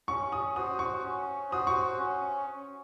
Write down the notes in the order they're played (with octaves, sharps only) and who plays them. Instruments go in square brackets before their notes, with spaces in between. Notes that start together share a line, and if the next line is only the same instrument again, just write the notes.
[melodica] C#4 [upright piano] C#6
[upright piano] D#6
[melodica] F#4 C5 [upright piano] D#6
[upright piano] C#6
[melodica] C#4
[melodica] F#4 C5 [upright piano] D#6
[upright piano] C#6
[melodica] C#4